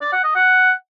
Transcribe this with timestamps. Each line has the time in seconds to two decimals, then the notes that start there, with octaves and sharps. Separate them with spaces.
0.01 D5
0.13 F#5
0.24 D#5
0.35 F#5